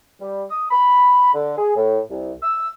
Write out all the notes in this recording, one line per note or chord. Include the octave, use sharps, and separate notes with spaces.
G3
D#6
B5
D3
G#4
A2
C2
E6